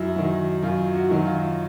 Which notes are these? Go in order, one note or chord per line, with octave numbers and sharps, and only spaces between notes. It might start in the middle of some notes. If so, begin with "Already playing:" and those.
Already playing: F#2 E4
D#3 F#3
F#2 F4
F#4
D#3 F#3
F4